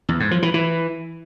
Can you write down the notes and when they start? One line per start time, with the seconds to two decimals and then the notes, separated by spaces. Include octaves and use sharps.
0.09 E2
0.20 G#2
0.31 F3
0.42 E3
0.54 E3